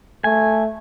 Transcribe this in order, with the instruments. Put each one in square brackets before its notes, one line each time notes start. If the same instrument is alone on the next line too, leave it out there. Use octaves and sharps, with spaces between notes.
[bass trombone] A3 [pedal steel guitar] G#5